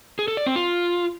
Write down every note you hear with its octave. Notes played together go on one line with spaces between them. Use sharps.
G#4
A4
D5
C4
F4